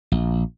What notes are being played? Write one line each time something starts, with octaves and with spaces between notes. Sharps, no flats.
A#1